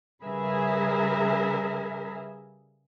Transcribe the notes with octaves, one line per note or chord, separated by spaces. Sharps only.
C#3 G3 G#4 A#4 B4 E5